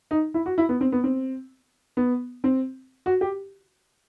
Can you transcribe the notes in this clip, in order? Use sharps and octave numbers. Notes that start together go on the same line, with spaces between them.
D#4
E4
F#4
E4
B3
C4
B3
C4
B3
C4
F#4
G4